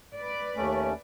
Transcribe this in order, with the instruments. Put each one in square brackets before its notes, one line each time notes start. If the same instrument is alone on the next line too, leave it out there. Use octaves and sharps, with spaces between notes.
[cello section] B4 D5
[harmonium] D#2 A3 C#4